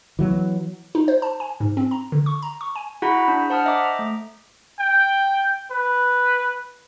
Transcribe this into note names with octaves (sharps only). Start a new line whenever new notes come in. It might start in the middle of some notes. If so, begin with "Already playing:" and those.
E3 F#3 A3 B3
D#4
C5
A5
G#5
G#2
C4
A#5
D3
C#6
A#5
C#6
G#5
E4 F#4 G#4 F#5 A#5 B5
D4
C5 F#5 A5 D#6 F6
D#5 E5 A#5 D6
A3
G5
B4